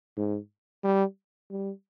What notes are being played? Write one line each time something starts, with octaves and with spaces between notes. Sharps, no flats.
G#2
G3
G3